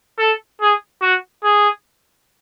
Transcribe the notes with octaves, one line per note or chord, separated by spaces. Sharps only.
A4
G#4
F#4
G#4